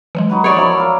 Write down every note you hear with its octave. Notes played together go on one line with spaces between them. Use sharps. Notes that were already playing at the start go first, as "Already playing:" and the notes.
E3 F#3 G#3
D#4 F#4 B4
D#4 C#5 D5
F#2 F3 E4 A5
A#4 F5